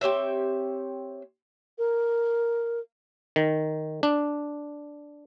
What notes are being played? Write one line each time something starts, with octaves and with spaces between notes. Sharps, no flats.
C4 G4 C#5 E5
A#4
D#3
D4